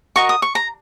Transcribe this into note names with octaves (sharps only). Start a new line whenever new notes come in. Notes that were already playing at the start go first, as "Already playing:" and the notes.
F#4 A#4 D#5 C#6
D#6
C#6
A#5